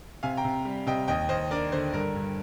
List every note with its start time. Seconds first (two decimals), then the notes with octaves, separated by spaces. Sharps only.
0.23 C3 F5 G#5
0.37 G5 A#5
0.44 C3
0.65 G3
0.87 C3 D#5 G5
1.08 D#2 D#5 G5
1.29 D#2 C5 D#5
1.51 D4 A#4 D5
1.72 D3 C5
1.93 G2 A#4
2.15 G2